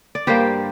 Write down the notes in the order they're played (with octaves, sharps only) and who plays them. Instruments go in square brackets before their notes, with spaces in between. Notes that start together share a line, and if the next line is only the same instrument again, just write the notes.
[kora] D5
G2 G3 A#3 G4 C5